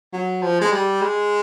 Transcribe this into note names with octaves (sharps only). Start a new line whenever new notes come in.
F#3
F3
G#3
G3
G#3